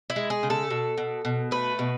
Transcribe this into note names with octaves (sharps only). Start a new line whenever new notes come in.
E4
G#3
G#4
C#3
A4
B2
B2
B2
A3 B4
B2